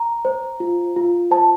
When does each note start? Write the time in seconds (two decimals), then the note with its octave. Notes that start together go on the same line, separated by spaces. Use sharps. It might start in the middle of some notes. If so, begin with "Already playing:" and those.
Already playing: A#5
0.25 C5
0.60 F4
0.96 F4
1.31 C5 A5